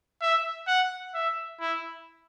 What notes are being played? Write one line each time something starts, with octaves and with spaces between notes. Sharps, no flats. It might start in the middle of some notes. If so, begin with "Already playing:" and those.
E5
F#5
E5
E4